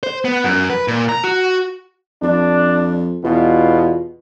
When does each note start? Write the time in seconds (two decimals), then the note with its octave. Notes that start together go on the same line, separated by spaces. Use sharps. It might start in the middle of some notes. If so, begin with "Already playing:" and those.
0.03 C5
0.25 B3
0.44 F#2
0.70 B4
0.88 A#2
1.09 A#5
1.24 F#4
2.22 F2 D4
3.24 E2 B2 F4